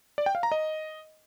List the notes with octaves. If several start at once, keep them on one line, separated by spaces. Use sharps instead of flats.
D5
G5
F5
A#5
D#5